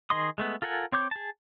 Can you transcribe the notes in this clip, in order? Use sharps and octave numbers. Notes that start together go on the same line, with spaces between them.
D#3 G#4 D#5 C6 D#6
G#3 A3 B3
F4 A4 A#4 F#5 G#5
C4 C#5 D6 G6
G#4 A5